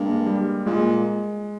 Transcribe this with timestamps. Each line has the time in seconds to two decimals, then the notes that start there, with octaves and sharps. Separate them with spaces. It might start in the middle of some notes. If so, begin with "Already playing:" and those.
Already playing: G2 G#3 A#3
0.26 G3
0.66 A#2 G#3